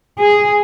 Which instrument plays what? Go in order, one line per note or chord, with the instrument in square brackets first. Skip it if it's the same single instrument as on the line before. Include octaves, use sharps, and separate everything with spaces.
[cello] G#4